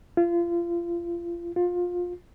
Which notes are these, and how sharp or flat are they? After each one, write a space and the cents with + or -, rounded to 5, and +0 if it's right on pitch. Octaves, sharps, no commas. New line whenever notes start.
F4 -30
F4 +20